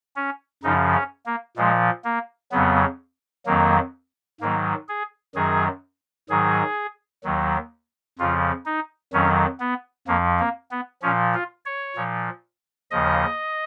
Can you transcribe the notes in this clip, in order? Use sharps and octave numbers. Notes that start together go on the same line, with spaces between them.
C#4
F#2 C#3 F3 D#4
C#4
A#3
A#2 F3 G#3
A#3
F2 C#3 F#3 B3
F2 D#3 F#3 A#3
G#2 D#3 F#3 A#3
G#4
F#2 D#3 F#3 G#4
G#2 D#3 F#3 G#4
D#2 D#3 F#3
F2 C#3 F3 F4
D#4
F2 D#3 F#3 C#4
B3
F2 F3 A#3
A#3
B3
A#2 F3 C#4
F4
C#5
A#2 F3
D#2 C#3 F3 D#5